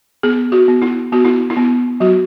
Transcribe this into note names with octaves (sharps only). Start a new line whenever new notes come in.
B3 G#4
F#4
B3
E4
B3 F#4
E4
E4
B3
F#3 F#4